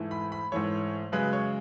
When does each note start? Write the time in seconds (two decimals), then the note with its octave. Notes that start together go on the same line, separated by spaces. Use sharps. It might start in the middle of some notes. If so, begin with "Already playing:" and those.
Already playing: G#2 E3 A3
0.11 B5
0.32 B5
0.52 G#2 E3 A3 C#5
1.12 F#2 C#3 G#3 B4
1.33 C#5